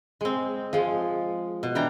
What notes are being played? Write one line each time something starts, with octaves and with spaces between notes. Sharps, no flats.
G#3 C4
F3 G#3
B2
E3 D4 G5 A#5